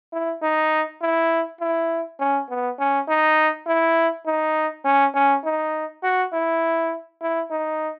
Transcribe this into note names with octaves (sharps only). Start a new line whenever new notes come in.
E4
D#4
E4
E4
C#4
B3
C#4
D#4
E4
D#4
C#4
C#4
D#4
F#4
E4
E4
D#4